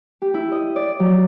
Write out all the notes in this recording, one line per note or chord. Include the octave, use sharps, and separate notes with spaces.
G4
E4
D#5
D5
F#3